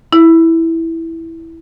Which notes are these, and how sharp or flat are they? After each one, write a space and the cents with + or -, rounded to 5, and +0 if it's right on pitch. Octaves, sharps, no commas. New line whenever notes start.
E4 -5